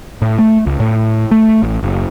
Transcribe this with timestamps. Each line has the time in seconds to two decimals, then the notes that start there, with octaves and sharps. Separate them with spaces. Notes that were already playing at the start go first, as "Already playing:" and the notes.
0.22 A2
0.39 A3
0.66 C#2
0.80 A2
1.31 A3
1.62 A1
1.83 F#1